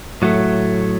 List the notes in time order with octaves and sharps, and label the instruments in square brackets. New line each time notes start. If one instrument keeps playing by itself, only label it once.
[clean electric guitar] A2 F#3 A3